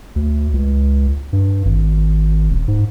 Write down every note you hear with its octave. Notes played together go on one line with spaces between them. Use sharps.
D2
C#2
G2
G#1
D#1
G#2